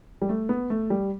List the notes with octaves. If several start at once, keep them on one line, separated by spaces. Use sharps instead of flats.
G3
A3
B3
A3
G3